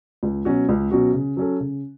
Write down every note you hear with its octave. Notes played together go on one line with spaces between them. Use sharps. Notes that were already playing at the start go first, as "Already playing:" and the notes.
C#2
B2 F#3 C#4 F#4
C#2
B2 F#3 C#4 F#4
C#3
F#3 C#4 A4
C#3